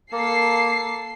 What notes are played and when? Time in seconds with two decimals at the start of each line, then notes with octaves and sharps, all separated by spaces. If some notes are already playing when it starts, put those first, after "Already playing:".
0.12 A#3 A4 C7